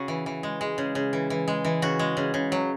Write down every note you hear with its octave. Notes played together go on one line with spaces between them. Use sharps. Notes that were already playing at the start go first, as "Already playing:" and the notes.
Already playing: C#3 F#4
E3
E3
G#3
G#3
C#3
C#3
E3
E3
G#3
E3
C#3 F#4
G#3
C#3
C#3
F#3